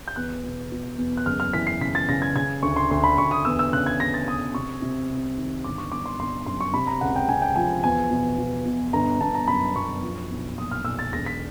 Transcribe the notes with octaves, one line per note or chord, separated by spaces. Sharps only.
G6
E2 F#6
B2
B2
E2
F#6
F#1 F6
F6
E3 B6
C7
C#3 B6
A6
C#3 A#6
G#6
C#3 G#6
D2 C#6
C6
D2 C6
B5
D2 C#6
D#6
E2 E6
E6
C#3 F#6
G#6
E2 A#6
A6
E2 D#6
C3 C#6
C3
C2
D#3
G1 D6
C#6
G1 D6
C6
G1 C6
F#2 C6
C#6
C3 B5
A#5
C#2 F#5
G5
C3 G#5
G5
F3 G#5
E2 G#5
B2
B2
B2
G1 A#5
G1 A5
A#5
F#2 B5
F#2 C#6
F3
B1
A#2 D#6
F6
B1 E6
A6
E1 A#6
B6